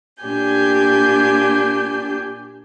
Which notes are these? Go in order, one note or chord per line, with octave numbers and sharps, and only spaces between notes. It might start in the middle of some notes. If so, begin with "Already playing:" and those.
A#2 D4 G4 G#5 G6